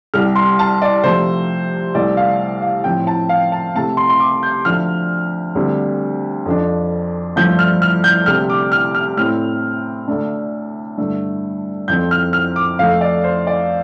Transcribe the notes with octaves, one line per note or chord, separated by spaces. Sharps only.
C2 C3 G3 F6
C6
A5
D5
C3 F3 A3 C5
C2 C3 A3 D5
F5
F5
A2 F3 C4 G5
A5
F5
A5
C3 A3 C4 A5
C6
C6
D6
G6
D2 D3 F3 F6
D2 D3 G3 C4
F2 F3 D4
G2 F3 A3 D4 G6
F6
F6
G6
D2 C3 G3 C4 F6
D6
F6
F6
A2 A3 C4 F6
D2 D3 A3 D4
G2 D3 A3
F2 F3 C4 G6
F6
F6
D6
F2 F3 A3 F5
D5
C5
D5